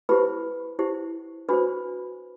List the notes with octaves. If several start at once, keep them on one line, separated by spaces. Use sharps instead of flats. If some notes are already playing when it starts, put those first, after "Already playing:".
E4 G4 B4 C5 B5
E4 G4 C5
D4 F#4 B4 C5 B5